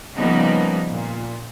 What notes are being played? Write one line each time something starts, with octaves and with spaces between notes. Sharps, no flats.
C#3 F3 G3 A#3 B3 D#4
A#2